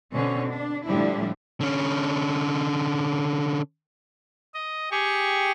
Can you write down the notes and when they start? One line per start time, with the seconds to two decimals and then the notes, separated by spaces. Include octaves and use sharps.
0.14 B2 D3 C4 C#4
0.50 D4
0.88 A2 D3 F3 G3 D4 E4
1.61 D3 C#4
4.54 D#5
4.91 G4 G#4 C#6